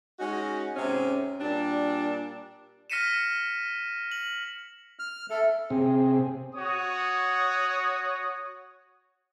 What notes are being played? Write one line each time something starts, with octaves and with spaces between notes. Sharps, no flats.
G#3 C#4 D#4 F#4
G#2 C3 C#4
A#2 G3 D4
F6 A#6 B6 C#7 D#7 E7
F#7
F6
A4 E5
C3 C4 G#4
F#4 C#5 D#6